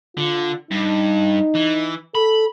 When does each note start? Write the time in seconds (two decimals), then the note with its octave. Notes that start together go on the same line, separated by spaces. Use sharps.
0.17 D3 F4
0.71 G2 D#4
1.55 E3
2.15 A4 B5